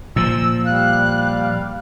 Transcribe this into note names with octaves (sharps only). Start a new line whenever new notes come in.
A#2 F3 E6
G3 F5 F#6